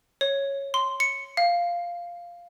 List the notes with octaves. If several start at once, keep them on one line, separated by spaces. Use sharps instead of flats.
C#5
C6
C#7
F5